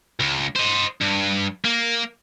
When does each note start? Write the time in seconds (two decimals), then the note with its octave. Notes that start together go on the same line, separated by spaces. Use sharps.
0.20 C#2
0.56 C5 D#5
1.01 G2
1.65 A#3